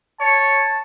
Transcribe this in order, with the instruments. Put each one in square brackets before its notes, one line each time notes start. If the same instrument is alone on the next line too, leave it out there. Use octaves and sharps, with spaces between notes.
[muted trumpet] C#5 [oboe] A5